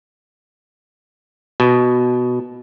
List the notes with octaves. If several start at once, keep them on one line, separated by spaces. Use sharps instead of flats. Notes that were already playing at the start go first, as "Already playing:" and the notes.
B2